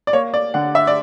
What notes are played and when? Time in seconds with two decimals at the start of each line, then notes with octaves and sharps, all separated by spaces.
0.07 D5
0.13 A#3 C#5
0.34 D5
0.54 D3 F#5
0.75 E5
0.87 D5